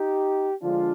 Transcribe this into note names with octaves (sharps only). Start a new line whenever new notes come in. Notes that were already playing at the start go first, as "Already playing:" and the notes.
Already playing: D#4 G4
D3 F3 G#3 D4 F4